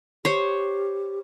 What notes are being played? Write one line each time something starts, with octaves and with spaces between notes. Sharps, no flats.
G4 C5 C#5